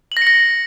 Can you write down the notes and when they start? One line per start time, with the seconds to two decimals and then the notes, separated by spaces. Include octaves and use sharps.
0.12 F#7
0.17 A#6
0.22 C#7
0.27 A#6